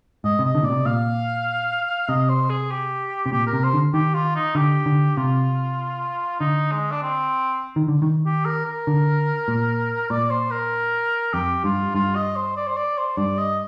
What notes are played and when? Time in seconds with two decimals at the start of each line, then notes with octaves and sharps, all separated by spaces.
0.24 G#2 D#5
0.39 C3
0.45 D#5
0.55 D3
0.62 A#2
0.65 C3 D5
0.85 A#2 F5
2.09 C3 D#5
2.29 C5
2.50 G#4
2.71 G4
3.26 C3
3.32 A#2 G4
3.47 A#4
3.53 C3
3.63 C5
3.74 D3
3.94 D#3 G4
4.14 F4
4.35 D#4
4.55 D3 G4
4.86 D3
5.17 C3 F4
6.40 D3 D#4
6.71 G#3
6.91 D4
7.02 C4
7.76 D#3
7.88 D3
8.02 D#3
8.26 G4
8.45 A#4
8.65 A#4
8.87 D3
9.48 A#2
10.10 A#2 D5
10.30 C5
10.51 A#4
11.33 F2 G4
11.64 G2 F4
11.95 G2 F4
12.16 D#5
12.36 C5
12.57 D5
12.67 C5
12.77 D5
12.98 C5
13.17 G2 D5
13.39 D#5